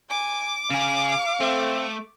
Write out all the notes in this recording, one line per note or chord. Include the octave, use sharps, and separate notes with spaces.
G#5 D6
C#3 G#4 F5
A3 C4